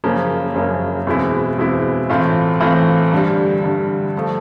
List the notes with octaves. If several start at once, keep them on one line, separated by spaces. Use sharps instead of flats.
F#1 F#2 C#3 F3 A#3
F#1 F#2 C#3 F3 A#3
E2 B2 G#3 C4 E4
E2 B2 G#3 C4 E4
A2 E3 A3 C4 F4
A2 E3 A3 C4 F4
G2 D3 G3
G2 D3 G3
F3 A3